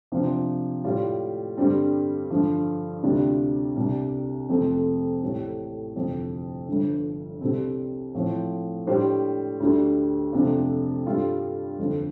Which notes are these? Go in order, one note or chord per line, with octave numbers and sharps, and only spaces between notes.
C3 F3 D4 F4 C5
A2 G3 F4
G2 D3 G3 C4
G2 D3 F3
D2 C3 G3 D4 F4
C2 C3 G3 D4
F2 C3 A3 C4 A4
A1 A2 G3
G1 F2 C3
G1 G2 D3 F3
C2 C3 G3 C4 A4
A2 F3 C4
A2 G3 D4 G4 C5
D2 D3 G3
F2 C3 A3 D4 F4
G2 G3 F4 A4
G1 F2 D3